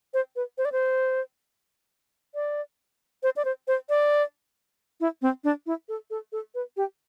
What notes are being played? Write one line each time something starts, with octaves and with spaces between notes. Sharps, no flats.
C5
B4
C5
D5
C5
D5
C5
D5
C5
C5
D5
E4
C4
D4
E4
A4
A4
A4
B4
G4